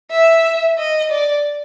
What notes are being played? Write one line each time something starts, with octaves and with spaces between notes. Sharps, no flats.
E5
D#5
D5